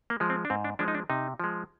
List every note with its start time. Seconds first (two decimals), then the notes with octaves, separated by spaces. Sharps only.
0.10 A#3
0.20 F3 G#3
0.30 C4
0.45 D4
0.50 G#2 C4
0.65 D4
0.79 F3 G#3 D4
0.88 D#4
0.95 D4
1.10 C3 D#4
1.40 F3 G#3